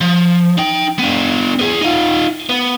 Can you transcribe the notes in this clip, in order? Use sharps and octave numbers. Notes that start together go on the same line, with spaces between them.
F3
D#4 G5
B3 D4
B3 G#4
D#4 F4
B3